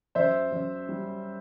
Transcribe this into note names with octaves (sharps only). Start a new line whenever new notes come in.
F#2 C5 E5
F#2
G3